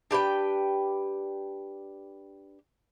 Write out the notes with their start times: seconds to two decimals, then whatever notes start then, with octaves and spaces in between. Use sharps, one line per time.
0.11 D4 G4 B4 G5